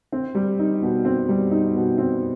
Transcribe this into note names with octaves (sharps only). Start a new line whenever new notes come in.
C4
G3
D#4
B2
C4
G3
D#4
B2
C4